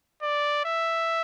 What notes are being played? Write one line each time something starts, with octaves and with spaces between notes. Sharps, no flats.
D5
E5